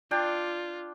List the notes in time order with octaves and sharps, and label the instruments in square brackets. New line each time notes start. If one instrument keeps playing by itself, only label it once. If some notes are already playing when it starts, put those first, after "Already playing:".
[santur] D4 G5 [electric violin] F4